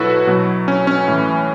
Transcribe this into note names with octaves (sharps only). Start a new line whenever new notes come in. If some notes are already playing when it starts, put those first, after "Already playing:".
Already playing: B2 F#3 E4 F#4 A4 B4
B2 F#3
C#4
C#4
A2 E3